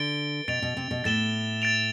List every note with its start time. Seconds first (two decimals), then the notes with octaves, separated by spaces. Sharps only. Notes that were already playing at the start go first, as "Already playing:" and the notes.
Already playing: D3 A6 D7 G7
0.48 B2 A6 D7 F7
0.62 B2
0.77 C3
0.91 B2
1.04 A2 A6 E7 G7
1.62 A6 D7 F7